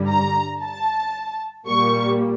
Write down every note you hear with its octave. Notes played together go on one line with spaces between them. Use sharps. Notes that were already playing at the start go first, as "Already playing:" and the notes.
Already playing: G2 D3 G3
A#5
A5
A#2 G3 A#3 C#6